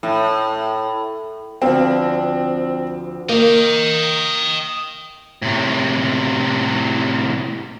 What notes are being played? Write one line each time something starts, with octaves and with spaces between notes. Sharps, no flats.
A2
D2 F3 C4
A#3 D#5 G5
A2 C3